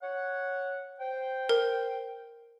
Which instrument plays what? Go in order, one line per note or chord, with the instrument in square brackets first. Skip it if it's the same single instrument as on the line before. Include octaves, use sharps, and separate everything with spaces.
[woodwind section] C#5 F#5
C5 G5
[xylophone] A#4